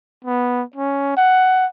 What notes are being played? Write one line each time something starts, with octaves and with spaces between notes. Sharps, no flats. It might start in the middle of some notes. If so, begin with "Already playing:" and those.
B3
C#4
F#5